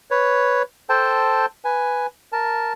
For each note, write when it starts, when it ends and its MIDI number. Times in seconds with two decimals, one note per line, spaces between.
0.11 0.62 71
0.11 0.62 73
0.89 1.46 69
0.89 1.46 72
0.89 1.46 79
0.89 1.46 81
1.65 2.07 71
1.65 2.07 80
2.32 2.73 70
2.32 2.73 81